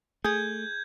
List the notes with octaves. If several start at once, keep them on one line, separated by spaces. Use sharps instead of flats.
A3 G#4 G6 G#6